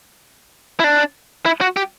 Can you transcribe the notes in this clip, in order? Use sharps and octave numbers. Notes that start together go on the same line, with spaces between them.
E4
D4
E4
F#4
G4